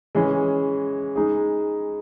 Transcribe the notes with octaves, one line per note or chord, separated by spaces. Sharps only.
E3 G#3 C#4 G#4
G#3 D#4 G#4